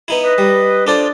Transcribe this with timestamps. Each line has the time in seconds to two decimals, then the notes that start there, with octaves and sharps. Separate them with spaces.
0.08 B3 D#4 E4
0.24 B4 D#5
0.38 G3
0.87 D4 F4 A4 C5 D5